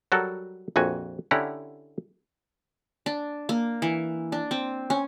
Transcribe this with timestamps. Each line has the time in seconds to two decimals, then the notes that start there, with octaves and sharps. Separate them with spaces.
0.12 F#3 G3 F#4 A4 A#4
0.76 A#1 F2 F#4 G#5
1.31 D3 C#4 E4 G4 F#5 A#5
3.06 D4
3.49 A#3
3.82 E3
4.32 D4
4.51 C4
4.90 C#4